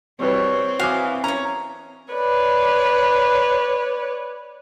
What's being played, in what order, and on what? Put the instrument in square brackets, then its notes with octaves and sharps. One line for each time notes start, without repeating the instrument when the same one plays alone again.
[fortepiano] B2 E3 G3 [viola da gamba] C4 [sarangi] C#5
[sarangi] E3 [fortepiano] F#4 D6 [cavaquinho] F5 G#5 D#6
[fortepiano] C#4 [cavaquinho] C#5 A#5
[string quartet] B4 C#5 D5